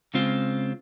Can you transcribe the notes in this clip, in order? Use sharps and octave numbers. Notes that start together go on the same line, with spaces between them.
C#3 G#3 C4 F4